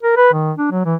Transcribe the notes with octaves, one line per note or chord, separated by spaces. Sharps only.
A#4
B4
D#3
D4
F#3
E3